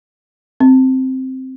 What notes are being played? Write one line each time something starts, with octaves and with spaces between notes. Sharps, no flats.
C4